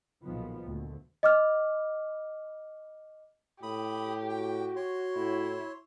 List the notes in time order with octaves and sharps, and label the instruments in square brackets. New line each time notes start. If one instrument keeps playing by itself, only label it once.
[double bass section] B1 A#2 D#3 F3 B3
D2 A#2
[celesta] D#5 D6 F6
[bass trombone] A2 [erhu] G4 [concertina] B5 D#6
[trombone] F#4 [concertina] G5
[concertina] C#5 C6
[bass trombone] A2 [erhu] E4